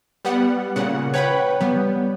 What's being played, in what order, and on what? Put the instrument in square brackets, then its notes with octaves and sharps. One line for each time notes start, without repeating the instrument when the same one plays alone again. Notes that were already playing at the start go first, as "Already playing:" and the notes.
[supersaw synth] G3 B3 F#5
A#2 C#3 F#5
[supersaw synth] B4 F#5 B5 [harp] C#5 G5
[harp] G3 [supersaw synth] B3